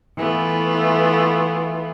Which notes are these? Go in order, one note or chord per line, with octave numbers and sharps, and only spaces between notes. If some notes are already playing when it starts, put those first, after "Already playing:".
E3 A3 B3 F4